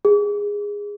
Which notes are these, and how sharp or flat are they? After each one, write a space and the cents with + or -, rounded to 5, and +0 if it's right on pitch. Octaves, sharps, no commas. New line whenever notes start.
G#4 -15